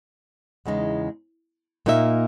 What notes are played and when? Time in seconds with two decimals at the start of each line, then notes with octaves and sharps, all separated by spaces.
0.66 E2 C#3 G#3 D#4
1.86 A#2 A#3 D#4 A#4 E5